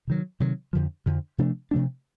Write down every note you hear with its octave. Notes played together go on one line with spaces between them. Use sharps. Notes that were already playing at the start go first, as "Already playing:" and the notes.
C3 D#3 F#3
C3 D#3 F#3
F2 D3 F3
F2 D3 F3
C3 F3 A3 D4
C3 F3 A3 D4